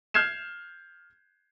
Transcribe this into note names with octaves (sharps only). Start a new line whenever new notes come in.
F6 G6 G#6 C7 E7